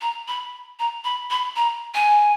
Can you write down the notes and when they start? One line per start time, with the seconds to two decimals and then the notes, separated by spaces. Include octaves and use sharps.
0.01 A#5
0.28 B5
0.79 A#5
1.04 B5
1.31 B5
1.56 A#5
1.95 G#5